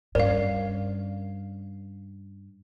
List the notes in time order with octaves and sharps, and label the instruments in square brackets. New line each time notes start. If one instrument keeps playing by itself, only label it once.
[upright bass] G2 C#4 [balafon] A#4 F5 [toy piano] D5